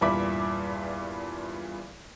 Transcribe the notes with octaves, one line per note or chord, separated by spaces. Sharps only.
E2 G2 A#2 E5 B5 D6